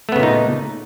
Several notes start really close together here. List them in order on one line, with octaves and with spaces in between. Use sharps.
A3 B3 C#3 A#2 D#4